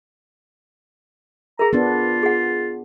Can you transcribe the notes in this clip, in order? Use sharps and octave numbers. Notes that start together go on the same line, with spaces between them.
G#4 A#4 A#5
B3 D4 F4
G#4 F#5